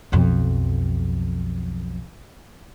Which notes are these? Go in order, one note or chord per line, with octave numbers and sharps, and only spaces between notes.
B1 F2